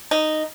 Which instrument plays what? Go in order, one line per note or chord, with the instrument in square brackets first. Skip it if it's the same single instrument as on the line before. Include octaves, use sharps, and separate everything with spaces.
[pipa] D#4